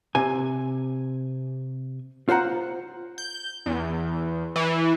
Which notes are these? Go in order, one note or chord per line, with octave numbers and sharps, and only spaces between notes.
C3 G#5
F4 C5 F#5 A#5
G6
E2
E3